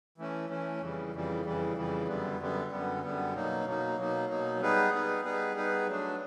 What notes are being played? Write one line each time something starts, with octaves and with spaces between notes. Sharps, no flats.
E3 A3 C#4
E3 A3 C#4
F2 C#3 E3 G3
F2 C#3 E3 G3
F2 C#3 E3 G3
F2 C#3 E3 G3
F#2 D3 G3 B3
F#2 D3 G3 B3
F#2 D3 G3 B3
F#2 D3 G3 B3
B2 F#3 A#3 D#4
B2 F#3 A#3 D#4
B2 F#3 A#3 D#4
B2 F#3 A#3 D#4
G3 B3 D#4 G#4 B4
G3 B3 D#4 G#4 B4
G3 B3 D#4 G#4 B4
G3 B3 D#4 G#4 B4
F#3 A3 D4